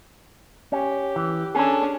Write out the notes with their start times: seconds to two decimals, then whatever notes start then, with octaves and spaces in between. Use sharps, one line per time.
0.72 C#4 G4
1.16 E3
1.55 C#4 D4 G#4 A4